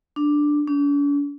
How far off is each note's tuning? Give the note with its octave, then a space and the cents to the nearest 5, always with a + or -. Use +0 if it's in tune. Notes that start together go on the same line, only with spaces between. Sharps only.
D4 +5
D4 -45